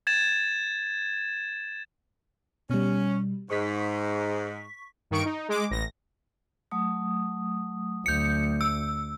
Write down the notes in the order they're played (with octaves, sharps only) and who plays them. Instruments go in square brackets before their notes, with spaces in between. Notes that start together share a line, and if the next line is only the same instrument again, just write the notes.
[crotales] G#6 A6 E7
[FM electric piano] B2 G3 [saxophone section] C#4
[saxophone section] G#2 [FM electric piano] C#6 B6
[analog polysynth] G2 D#3 C#6 D7
D#4
G#3 D6
A1 A#6
[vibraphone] F#3 A3 D#6
[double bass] D2 [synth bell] G6 C#7
[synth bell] E6